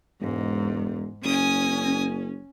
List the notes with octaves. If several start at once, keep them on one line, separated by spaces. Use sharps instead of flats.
E1 G#2
F#1 C#4 G#5 D#6